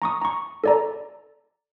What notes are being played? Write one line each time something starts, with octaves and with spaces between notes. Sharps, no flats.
A#5 C#6 D#6
A#5 C#6
A4 D5 A#5